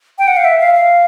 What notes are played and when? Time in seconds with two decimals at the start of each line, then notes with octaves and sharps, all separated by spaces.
0.19 G5
0.28 F#5
0.37 F5
0.45 E5
0.59 F5
0.74 F5